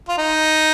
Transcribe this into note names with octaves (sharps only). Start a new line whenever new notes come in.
F4
D#4